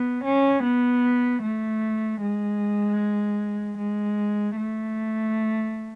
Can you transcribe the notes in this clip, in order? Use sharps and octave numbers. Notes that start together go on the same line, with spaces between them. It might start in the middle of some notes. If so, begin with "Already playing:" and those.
Already playing: B3
C#4
B3
A3
G#3
G#3
A3